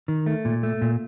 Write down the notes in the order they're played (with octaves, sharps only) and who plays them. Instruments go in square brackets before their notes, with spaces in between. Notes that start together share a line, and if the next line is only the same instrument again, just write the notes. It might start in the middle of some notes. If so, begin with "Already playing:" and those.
[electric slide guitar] D#3
A3
A#2
A3
A#2